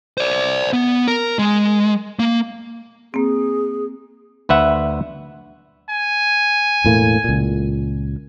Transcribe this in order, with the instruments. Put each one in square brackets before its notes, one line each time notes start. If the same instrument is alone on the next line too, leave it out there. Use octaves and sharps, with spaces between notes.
[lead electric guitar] C5 D5
B3
A#4
G#3
A#3
[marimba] A#3 C4 [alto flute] G#4
[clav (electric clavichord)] D2 B4 E5 F#5
[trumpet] G#5
[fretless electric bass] E1 A2 A#3
C#2 A#2